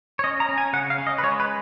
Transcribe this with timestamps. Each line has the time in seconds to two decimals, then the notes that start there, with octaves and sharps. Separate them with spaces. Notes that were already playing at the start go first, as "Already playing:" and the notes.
0.19 C#5
0.24 C#4 D#5
0.40 A#5
0.49 C#4
0.58 G#5
0.73 C#3 F#5
0.90 F5
0.98 C#4
1.07 D#5
1.18 B4
1.23 G#3 C#5
1.40 B4